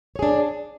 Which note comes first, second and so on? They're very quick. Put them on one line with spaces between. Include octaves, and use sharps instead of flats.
C#5 G#4 D4